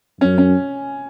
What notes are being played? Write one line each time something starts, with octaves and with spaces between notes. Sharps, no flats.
F#2 C#4
C#4